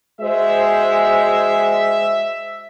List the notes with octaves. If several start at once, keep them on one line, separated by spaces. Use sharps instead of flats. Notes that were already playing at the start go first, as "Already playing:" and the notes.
G#3 F#4 C5 E5